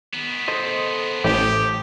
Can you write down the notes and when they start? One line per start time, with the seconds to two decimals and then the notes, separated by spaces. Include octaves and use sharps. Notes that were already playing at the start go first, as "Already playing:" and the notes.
0.13 D#3 B3
0.48 A4 C5 D#5
1.24 A1 G4